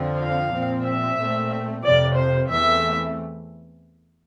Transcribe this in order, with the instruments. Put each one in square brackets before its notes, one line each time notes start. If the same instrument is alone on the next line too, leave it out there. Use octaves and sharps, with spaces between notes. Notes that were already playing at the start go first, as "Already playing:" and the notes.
Already playing: [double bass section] F2 D3 F3 C4
[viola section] F5
[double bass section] A#2 F3 C4
[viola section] E5
[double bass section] A#2 A3 C4
[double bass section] F2 C3 F3 [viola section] D5
[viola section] C5
[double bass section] E2 E3 A3 C4 [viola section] E5